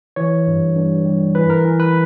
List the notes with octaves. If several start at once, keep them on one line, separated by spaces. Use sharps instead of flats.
E3 C#5
G2
G2
G3
E3 B4
A#4
E3
B4